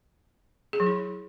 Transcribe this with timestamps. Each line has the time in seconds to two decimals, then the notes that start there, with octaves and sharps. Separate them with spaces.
0.73 G#4
0.80 F#3
0.86 E4